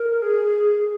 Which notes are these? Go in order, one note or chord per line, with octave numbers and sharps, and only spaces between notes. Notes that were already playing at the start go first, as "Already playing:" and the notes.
Already playing: A#4
G#4